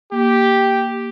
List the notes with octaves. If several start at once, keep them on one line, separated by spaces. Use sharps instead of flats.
A#3 G4